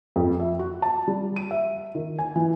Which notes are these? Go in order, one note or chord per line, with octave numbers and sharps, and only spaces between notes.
F2
E5
F#4
A5
G3
D#7
E5
D#3
G#5
E3